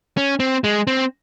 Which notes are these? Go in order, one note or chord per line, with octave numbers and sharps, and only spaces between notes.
C#4
C4
G#3
C4